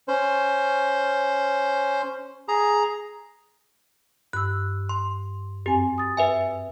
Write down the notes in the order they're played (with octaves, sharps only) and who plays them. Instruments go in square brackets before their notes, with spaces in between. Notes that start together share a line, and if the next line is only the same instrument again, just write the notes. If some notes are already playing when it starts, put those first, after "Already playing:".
[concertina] C#4 C5
G#4 A#5
[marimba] G2 E6 [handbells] F#6
[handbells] C6
[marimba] F#2 C4 G#5 [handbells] G4
[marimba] D#6 A6
[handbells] B4 E5 G#5